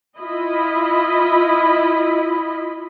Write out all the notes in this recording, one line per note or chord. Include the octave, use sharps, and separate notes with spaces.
E4 F4 D#5 B5